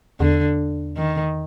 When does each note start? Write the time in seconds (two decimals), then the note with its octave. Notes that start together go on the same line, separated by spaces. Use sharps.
0.20 E2 D3
0.97 D#3